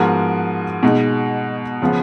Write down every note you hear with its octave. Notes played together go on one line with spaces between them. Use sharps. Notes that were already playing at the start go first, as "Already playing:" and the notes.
Already playing: G#2 F3 B3 F#4 A#4
B2 G#3 D#4
C#3 F3 B3